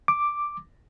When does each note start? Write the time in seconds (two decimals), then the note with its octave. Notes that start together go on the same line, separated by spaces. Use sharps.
0.08 D6